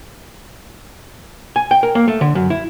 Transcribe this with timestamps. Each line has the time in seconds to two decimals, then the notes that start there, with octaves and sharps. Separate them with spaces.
1.56 G#5
1.71 G5
1.83 A#4
1.95 A#3
2.08 A3
2.21 D3
2.35 F#2
2.50 E4